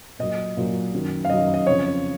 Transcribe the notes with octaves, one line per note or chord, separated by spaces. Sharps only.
A#2 F#3 D#5
A#2 F#3
F#2 D#3 F#3
F5
F#2 D#3 F#3 D#5
D#5
F2 C#3 F3 C#5